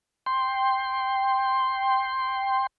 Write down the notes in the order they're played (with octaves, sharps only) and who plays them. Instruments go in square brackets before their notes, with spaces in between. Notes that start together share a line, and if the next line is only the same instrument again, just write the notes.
[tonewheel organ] G5 C6